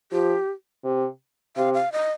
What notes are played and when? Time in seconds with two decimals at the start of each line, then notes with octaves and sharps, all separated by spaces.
0.12 F3 G4
0.84 C3
1.56 C3 F5
1.74 F5
1.92 D#5